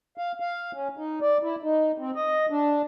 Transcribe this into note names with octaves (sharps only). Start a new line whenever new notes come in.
F5
F5
C#4
D#4
D5
E4
D#4
C4
D#5
D4